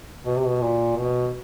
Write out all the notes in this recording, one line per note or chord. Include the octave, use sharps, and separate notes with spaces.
B2
C3
B2
A#2
B2